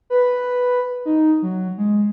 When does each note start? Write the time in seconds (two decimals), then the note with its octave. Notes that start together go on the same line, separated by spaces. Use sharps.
0.10 B4
1.05 D#4
1.42 F#3
1.78 G#3